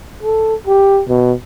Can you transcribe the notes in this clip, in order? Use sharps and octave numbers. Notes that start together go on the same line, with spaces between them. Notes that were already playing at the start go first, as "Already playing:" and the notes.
A4
G4
B2